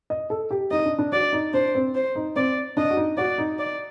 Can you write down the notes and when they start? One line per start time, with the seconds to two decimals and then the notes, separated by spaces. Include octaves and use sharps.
0.10 D#5
0.30 A4
0.51 G4
0.71 D#4 D#5
0.85 D4
0.99 D4
1.13 F#4 D5
1.33 D#4
1.54 D4 C5
1.75 C4
1.95 C5
2.16 D#4
2.36 C4 D5
2.77 D4 D#5
2.90 F#4
2.97 D#4
3.17 F#4 D5
3.38 D#4
3.59 D5